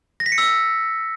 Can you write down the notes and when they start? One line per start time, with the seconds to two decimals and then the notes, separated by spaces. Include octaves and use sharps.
0.20 A#6
0.26 B6
0.32 C#7
0.38 E6